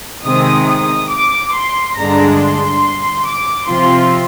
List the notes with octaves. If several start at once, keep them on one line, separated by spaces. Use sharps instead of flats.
C3 D#3 G#3 C4 D#6
D#6
D6
C6
G2 D3 G#3 D4 A#5
C6
D6
C3 F3 C4 F4 C6